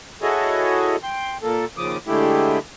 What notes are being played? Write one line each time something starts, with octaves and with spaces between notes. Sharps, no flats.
E4 F#4 G#4 A4 C#5 D#5
G5 C6
A#2 A#3 A4
D#2 C#3 F3 D6 D#6
D3 G#3 A3 E4 G4